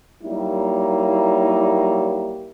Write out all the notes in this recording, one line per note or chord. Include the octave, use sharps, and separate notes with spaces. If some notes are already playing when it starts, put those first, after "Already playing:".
F#3 G3 A#3 D#4 E4